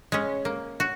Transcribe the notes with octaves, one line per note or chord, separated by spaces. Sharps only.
G#3 C#4
A#3
F#4